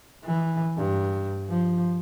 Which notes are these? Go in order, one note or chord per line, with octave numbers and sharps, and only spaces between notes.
E3
G2
F3